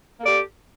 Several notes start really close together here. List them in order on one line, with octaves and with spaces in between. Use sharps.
A#3 A4 D5 G4